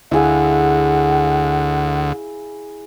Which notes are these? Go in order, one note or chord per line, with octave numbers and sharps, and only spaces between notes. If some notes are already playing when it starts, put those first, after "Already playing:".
D2 E4 G#4 F5 F#5